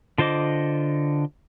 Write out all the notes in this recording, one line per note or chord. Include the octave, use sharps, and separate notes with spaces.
D3 F4 C5 D#5 D6